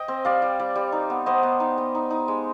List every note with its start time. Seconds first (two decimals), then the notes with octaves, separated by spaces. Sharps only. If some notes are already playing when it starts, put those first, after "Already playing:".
Already playing: D#5 G5
0.08 C4
0.25 G3 D5 F5
0.42 G3
0.60 G3
0.76 G3
0.92 D#4
1.10 B3
1.26 B3 C5 D#5
1.43 B3
1.60 D#4
1.78 B3
1.95 D#4
2.10 D#4
2.28 G#3